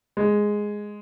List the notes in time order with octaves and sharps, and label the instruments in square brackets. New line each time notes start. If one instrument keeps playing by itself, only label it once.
[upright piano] G#3